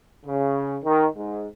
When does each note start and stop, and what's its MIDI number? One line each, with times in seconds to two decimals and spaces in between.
0.24 0.76 49
0.82 1.04 51
1.13 1.44 44